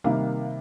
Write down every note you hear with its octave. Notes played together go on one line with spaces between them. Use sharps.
C3 D#3 G3 A#3 F5